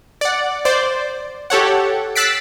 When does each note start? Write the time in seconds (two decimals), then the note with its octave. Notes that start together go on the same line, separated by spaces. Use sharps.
0.21 D5 F#5
0.65 C5 D5
1.50 G4 A4 C#5 F#5
2.16 E6 F#6 A6 B6 C7 D7